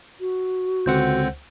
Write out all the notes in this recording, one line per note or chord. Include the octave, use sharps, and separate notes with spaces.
F#4
C#2 D3 C4 C5 F#5 G6